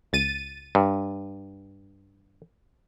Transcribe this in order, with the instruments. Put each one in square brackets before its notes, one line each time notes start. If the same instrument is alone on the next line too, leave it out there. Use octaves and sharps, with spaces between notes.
[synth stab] C#2 A6 D#7
[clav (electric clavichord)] G2